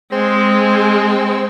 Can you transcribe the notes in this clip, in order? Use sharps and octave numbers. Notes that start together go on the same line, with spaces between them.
G#3 C4